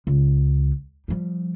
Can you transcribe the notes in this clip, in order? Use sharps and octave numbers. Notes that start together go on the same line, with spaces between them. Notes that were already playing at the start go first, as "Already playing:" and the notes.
C#2
F3 G3